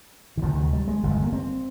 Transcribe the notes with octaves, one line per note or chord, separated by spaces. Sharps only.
D#3
D2 C3 F3
D#3
D#3
G3
G#3
G1 F2 C3
G#3
A#3
C4